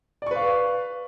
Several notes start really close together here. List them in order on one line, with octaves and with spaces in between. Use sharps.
D5 C#6 B4 F5